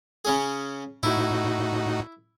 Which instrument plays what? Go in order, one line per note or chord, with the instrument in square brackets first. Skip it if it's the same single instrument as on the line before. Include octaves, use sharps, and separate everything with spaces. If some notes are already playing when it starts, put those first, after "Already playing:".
[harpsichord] C#3 C#4 G#4
[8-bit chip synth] A2 D#4 F#4 [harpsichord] E4